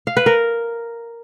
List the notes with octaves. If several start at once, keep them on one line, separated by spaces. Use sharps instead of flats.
F5
B4
A#4